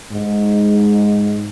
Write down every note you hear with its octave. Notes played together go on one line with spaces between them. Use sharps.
G#2